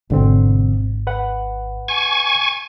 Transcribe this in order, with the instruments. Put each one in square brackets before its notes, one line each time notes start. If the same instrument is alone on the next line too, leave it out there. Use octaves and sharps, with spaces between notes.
[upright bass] G#1 [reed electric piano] B2 D3 C4
[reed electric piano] B4 F#5
[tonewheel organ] G#5 C#6